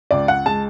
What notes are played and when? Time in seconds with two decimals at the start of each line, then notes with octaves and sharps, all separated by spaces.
0.11 C#2 D5
0.28 F#5
0.46 G#3 A5